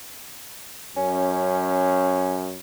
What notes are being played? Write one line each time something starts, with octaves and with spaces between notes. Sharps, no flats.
F#2 C#4